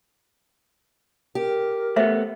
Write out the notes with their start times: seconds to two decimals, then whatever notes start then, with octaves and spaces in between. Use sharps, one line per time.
1.35 G4 A#4
1.96 A3 B3 C5 E5